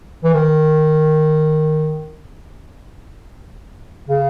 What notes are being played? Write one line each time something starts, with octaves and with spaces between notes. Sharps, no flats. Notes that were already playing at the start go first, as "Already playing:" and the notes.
E3
D#3
C#3